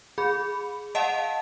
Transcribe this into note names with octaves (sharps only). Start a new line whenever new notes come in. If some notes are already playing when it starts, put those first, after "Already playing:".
G#4 B5
D#5 F5 F#5 A5